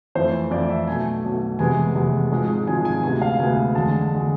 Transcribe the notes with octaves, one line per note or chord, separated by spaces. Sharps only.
F2 E3 A3 C5
F2 E3 A3 D5
E5
B1 B2 A3 G#5
B1 B2 A3
F1 E2 C3 G#3 B3 G#5
F1 E2 C3 G#3 B3
G#1 G#2 F3 G#3
G#1 G#2 F3 G#3 G#5
G#5
D2 C3 G#3 B3 G#5
F5
D2 C3 G#3 B3 G#5
F1 E2 D3 G#3 A5
D3 G#3